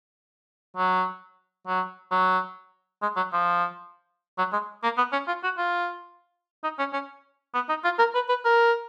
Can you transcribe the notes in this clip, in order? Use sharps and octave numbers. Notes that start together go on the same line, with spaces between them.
F#3
F#3
F#3
G#3
F#3
F3
F#3
G#3
A#3
B3
C#4
F4
F#4
F4
D#4
C#4
C#4
B3
D#4
F4
A#4
B4
B4
A#4